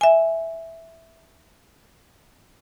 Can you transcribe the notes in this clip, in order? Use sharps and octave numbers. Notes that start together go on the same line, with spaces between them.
E5 G#5